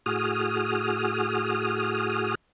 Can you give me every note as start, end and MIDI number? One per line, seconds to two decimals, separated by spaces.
0.06 2.35 45
0.06 2.35 66
0.06 2.35 68
0.06 2.35 87
0.06 2.35 89